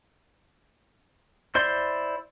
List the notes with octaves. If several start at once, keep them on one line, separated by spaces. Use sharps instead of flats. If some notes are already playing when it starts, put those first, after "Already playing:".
E4 C5 D5 C6